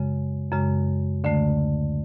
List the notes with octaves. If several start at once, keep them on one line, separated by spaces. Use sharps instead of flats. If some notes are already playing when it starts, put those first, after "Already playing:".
Already playing: F#2 C#3 G#3
F#2 C#3 G#3
D2 D3 A3